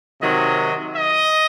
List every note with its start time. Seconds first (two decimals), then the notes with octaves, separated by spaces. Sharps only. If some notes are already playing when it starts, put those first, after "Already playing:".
0.22 C3 D#3 F#3 D#5
0.96 D#5